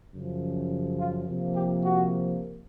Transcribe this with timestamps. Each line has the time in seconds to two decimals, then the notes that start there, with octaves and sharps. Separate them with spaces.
0.13 F#2 C#3 F3
0.99 F4
1.27 C3 F3 A#3
1.56 G4
1.84 F#4